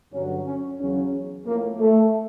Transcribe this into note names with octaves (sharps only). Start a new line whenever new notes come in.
G2 D3 F#3 C#4
C#4
E2 C#3 F#3 C#4
A2 F3 A#3
A3